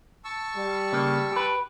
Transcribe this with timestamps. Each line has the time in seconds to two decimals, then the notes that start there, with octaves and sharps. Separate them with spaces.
0.25 A5 C#6 E6
0.55 G3
0.93 C#3 A#3
1.32 G4 B4